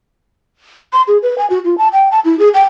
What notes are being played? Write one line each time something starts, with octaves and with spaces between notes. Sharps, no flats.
C6
G#4
B4
G#5
F#4
F4
A5
G5
A5
E4
G#4
G5